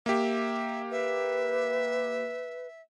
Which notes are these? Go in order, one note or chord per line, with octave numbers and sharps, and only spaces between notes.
A#3 G4 E5
B4 E5